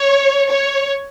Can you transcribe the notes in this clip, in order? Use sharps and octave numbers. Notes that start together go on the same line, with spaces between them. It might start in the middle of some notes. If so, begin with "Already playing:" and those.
Already playing: C#5
C#5